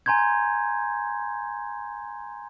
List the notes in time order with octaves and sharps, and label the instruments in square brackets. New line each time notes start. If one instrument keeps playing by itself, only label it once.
[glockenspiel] G#5 A#5 C6 G6 G#6